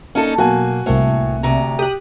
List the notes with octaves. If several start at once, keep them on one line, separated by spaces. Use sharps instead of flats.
A#3 C#4 D#4 A4
B2 F#3 A#3 F#4 G#5
C2 A2 A#3 C4
D2 C3 A#5
G4 D#6 F#6